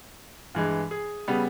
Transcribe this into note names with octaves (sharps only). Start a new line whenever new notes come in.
G2 E3 G#3
G#4
C#3 G3 B3